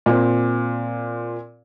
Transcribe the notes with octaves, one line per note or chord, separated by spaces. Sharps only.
A#2 C4